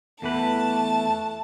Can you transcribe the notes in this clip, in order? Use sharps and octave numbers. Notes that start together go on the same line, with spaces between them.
E2 E3 A3 B4 A5